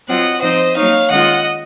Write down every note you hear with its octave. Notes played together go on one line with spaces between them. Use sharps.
F#3 C4 F4 D#5 F#5
F3 C4 D#4 C5 D#5
F#3 A#3 D#4 C#5 F5
D#3 G#3 C#4 F4 D#5 F#5